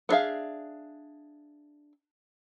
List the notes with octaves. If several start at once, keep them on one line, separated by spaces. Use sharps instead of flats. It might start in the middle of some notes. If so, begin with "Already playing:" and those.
B3 D4 G#4 E5 F5